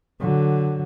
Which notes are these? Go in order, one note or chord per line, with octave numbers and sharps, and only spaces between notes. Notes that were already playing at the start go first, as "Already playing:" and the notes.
D3 F#3